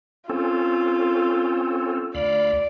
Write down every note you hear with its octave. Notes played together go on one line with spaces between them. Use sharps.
C4 C#4 F4 A4
D2 D5 F5 B5